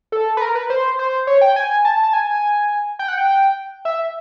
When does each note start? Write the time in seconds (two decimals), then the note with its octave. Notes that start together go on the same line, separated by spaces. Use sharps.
0.12 A4
0.37 B4
0.42 A#4
0.55 B4
0.70 C5
0.99 C5
1.27 C#5
1.41 G5
1.56 G#5
1.85 A5
2.03 A5
2.13 G#5
2.99 G5
3.08 F#5
3.18 G5
3.85 E5